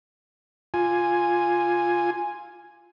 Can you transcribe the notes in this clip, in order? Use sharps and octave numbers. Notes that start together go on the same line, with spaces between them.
F4 G#5